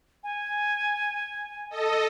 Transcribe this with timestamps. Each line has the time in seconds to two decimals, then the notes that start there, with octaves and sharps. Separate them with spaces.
0.24 G#5
1.70 A4 D#5